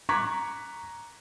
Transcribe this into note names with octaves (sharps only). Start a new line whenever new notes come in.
A#5 C#6 D6 F#6 G#6 B6